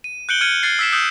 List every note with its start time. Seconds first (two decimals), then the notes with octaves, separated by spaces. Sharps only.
0.04 D#7
0.29 F#6 G6 C#7 D7 F#7 G7
0.41 F6 G#6 C#7 D#7
0.63 F6 G#6 A6 C7
0.79 E6 B6 E7
0.93 D#6 E6 F#6 G6 C#7